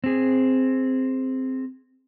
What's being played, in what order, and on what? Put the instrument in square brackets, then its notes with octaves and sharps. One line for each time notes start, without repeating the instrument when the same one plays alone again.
[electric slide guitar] C4 G#4